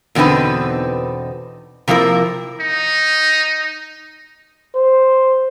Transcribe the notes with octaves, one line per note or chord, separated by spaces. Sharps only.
E2 B2 D3 C4 D#4 B4
C3 F3 A#3 E4 A#4
D#4
C5